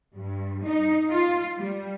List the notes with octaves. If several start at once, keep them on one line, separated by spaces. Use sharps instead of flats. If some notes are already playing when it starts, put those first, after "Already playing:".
G2
D#4
F4
G3